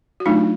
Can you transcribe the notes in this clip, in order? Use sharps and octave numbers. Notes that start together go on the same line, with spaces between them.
F#4
F#3 A3 D4 D#4 F4